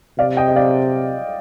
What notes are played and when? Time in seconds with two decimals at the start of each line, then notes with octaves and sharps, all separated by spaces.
0.19 C3 D5 F5
0.37 D#5 G5
0.48 D#5
0.56 D5 F5